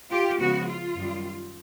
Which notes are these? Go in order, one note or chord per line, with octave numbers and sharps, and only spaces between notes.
F4 G4
C#3 F3 G#3 B3 F#4
F4
F#2 D#3 G3